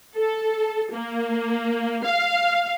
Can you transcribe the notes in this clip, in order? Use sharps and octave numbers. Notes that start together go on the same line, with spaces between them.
A4
A#3
F5